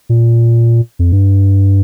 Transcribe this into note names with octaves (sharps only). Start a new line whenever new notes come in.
A#2
F2
G2